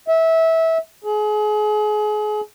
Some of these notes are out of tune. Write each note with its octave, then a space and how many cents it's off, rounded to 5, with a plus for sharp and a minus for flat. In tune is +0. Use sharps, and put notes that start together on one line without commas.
E5 -20
G#4 +30